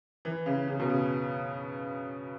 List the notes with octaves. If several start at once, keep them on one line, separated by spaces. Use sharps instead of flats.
E3
C#3
C#3
B2
C#3